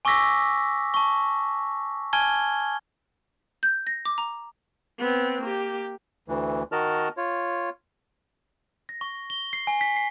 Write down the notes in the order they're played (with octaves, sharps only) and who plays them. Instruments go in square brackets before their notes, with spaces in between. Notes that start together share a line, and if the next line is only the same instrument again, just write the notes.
[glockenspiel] G#5 C#6 D6 E6 A#6 B6
A5 C#6
G#5 A5 F6 G#6 G7
[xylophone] G6
A#6
D6
A#5
[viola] B3 C4
A#3 G4
[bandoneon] D2 E3
D#3 F#4 A#4 D#5 A5 F6
F4 C#5
[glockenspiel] A#6
C#6
G7
C7
G#5
B6
C7